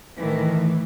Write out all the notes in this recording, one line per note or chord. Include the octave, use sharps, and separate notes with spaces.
A2 D#3 E3